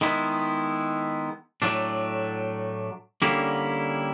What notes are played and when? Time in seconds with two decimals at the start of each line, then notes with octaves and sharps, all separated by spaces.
0.01 D#3 G#3 B3 E4
1.62 A2 F#3 A3 D4
3.22 D3 G3 A#3 C#4 E4